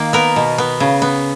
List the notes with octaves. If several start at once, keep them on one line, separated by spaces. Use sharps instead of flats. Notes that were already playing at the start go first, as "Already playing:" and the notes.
Already playing: D#3 A#3
B3 A#4
B2
B3
C#3
B3